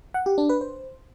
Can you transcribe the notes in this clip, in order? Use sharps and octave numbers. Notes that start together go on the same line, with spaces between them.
F#5
G4
D4
B4
C5